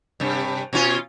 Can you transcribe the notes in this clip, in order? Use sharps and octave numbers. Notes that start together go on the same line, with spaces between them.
G2 C3
B2 C#4 F4